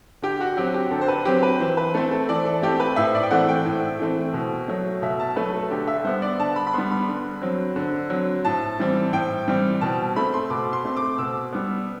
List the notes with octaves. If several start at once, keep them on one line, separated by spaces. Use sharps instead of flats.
D3 G4
F#4
F#3 C4 G4
G4
D3 A4
C5
B4
F#3 C4 G4
B4
E3 C5
B4
A3 C4 A4
A4
E3 D5
A4
A3 C4 G4
B4
A2 E5
D5
G5
E3 A3 C4 F#5
G5
A2
E3 A3 C4
B2
F#3 A3
B2 E5
A5
F#3 A3 B4
A4
D3 G4
E5
G3 B3 C5
D5
D3 A5
B5
B5
G3 B3 C6
B5
D3
F#3 C4
D3
F#3 C4
A2 A5
E3 G3 C4
A2 G5
E3 G3 C4
B2 A5
A3 C4 B5
C6
B2 D6
C6
A3 C4
D6
B2 E6
G3 B3